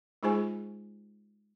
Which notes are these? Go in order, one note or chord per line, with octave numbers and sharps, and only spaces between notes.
G#3 D#4 F4 G#4 C5 G#5